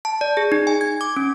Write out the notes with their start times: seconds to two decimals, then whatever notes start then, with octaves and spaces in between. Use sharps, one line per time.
0.05 A5
0.21 D5
0.37 G#4
0.52 D#4
0.67 G#5
0.81 G#6
1.01 D6
1.17 C#4